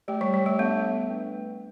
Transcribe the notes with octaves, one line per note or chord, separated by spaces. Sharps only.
A3 G4 D5 G5
G3
G3
A3
B3 D4 A4 E5 A5
A3 D4 B4 G5